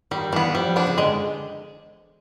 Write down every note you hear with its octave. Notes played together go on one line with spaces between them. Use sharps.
D#3 G3
E3 B3 D4
F3 G3
B3 D4
C#3
D3 G#3